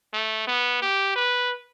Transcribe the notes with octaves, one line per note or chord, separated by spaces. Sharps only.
A3
B3
G4
B4